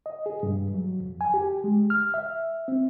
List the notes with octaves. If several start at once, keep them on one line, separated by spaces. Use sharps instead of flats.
D#5
G#4
G2
F#3
F2
G#5
G4
G#3
F6
E5
C4